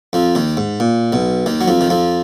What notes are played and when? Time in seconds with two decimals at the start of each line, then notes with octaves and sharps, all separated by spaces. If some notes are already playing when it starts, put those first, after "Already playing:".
0.13 F2 F3
0.35 D#2 D#3
0.57 G#2
0.80 A#2
1.12 B1 B2
1.46 D#2 D#3
1.61 F#3
1.68 F2 F3
1.81 D#3
1.90 F2 F3